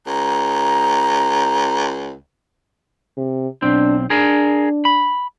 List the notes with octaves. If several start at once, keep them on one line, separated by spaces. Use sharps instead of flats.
C#2 A#5
C3
B1 C4 D4
D4 G#4 A#4
B5